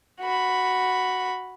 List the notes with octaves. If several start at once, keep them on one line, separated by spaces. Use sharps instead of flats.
F#4 B5